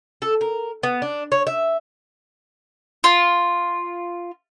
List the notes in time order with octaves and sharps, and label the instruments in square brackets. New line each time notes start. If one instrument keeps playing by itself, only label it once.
[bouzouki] A4
A#4
B3
D4
C#5
E5
[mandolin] F4